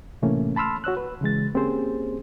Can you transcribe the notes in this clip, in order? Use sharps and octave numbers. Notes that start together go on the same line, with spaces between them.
A2 C3 E3 A3 A#3 C#4
A5 B5 C6 E6 F6
F#4 C#5 E6 F#6
B4
C#3 E3 G#3 A6
A#3 C4 C#4 G4 G#4 C5